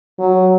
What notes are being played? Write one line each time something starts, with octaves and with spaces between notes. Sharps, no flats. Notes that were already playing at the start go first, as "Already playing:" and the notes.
F#3